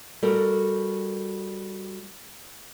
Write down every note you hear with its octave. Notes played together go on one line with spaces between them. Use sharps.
G3 F#4 A4 A#4